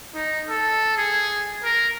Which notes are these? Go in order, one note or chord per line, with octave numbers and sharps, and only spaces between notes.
D#4
A4
G#4
A#4